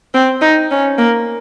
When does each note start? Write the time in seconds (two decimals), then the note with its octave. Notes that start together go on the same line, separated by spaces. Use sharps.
0.14 C4
0.41 D#4
0.71 C#4
0.98 A#3